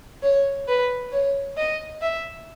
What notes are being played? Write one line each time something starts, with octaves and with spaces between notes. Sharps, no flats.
C#5
B4
C#5
D#5
E5